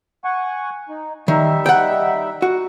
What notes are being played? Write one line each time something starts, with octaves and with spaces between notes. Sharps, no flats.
F#5 G#5 C#6
D#4
D#3 G3 D#4 E5
F#5 G5
F#4